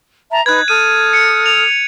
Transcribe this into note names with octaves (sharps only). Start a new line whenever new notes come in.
E5 A5 A#5
D#4 B4 F#6 G#6
A4 D#6 F6 D#7
C#7
F7